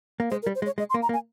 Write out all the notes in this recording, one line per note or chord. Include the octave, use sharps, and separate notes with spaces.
A#3
G#3 C5
A#4
G3
C5
G#3
C#5
G#3 D#5
C6
A#3
A#5
A#3
G#5